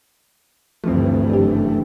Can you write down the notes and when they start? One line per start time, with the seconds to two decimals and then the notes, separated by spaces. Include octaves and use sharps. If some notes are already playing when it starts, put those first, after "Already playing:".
0.84 D2 G2 E3 F3 A3 C4
1.30 F#1 D4 G4